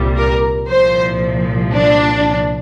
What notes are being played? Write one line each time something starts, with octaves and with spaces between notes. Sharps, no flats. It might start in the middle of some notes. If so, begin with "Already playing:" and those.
Already playing: C2 A#2 G3
A#4
C2 A#2 F3 C5
D4